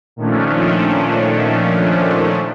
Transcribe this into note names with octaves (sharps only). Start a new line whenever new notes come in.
A#2 D#3 F3 A3 C#4 D4